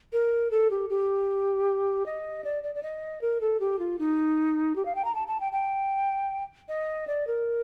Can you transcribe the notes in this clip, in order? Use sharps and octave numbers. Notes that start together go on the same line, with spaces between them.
A#4
A4
G4
G4
D#5
D5
D5
D5
D#5
A#4
A4
G4
F4
D#4
G4
F5
G5
A#5
A5
A5
G5
G5
D#5
D5
A#4